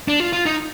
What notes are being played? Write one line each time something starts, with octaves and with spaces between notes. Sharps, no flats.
D4
F4
F4
D#4